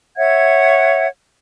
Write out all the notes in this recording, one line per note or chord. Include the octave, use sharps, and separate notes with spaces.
C#5 E5 F#5 G#6